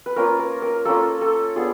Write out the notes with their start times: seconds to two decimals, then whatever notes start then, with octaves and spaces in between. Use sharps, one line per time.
0.06 B4
0.16 A#3 C#4 F4 A#4
0.39 A#4
0.62 A#4
0.85 A#3 C#4 F4 A4
1.21 A4
1.56 B3 D4 F4 G#4